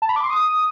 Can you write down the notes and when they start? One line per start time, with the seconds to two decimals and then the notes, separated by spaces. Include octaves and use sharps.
0.02 A5
0.09 B5
0.16 D6
0.23 C6
0.30 D#6